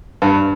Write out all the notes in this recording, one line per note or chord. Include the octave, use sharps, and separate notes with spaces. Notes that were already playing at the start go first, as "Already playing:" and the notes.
G2